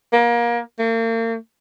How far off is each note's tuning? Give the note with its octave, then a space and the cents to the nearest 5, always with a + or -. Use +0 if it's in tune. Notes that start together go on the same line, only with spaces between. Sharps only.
A#3 +25
A#3 -40